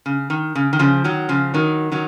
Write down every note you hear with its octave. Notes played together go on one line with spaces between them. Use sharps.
C#3
D#3
C#3
D#3
C#3 F3
D#3 F#3
C#3 F3
D#3 F#3
D#3 F#3